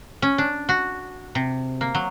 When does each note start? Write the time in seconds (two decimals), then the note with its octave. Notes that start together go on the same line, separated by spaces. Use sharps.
0.22 C#4
0.38 D4
0.69 F#4
1.35 C3
1.81 A#3
1.95 F#3